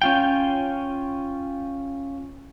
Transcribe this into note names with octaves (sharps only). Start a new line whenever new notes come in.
C#4 F4 G5